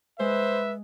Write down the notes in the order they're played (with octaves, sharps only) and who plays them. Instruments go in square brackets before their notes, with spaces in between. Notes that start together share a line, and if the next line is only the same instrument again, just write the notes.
[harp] G#3 [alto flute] B4 [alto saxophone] C5 [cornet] E5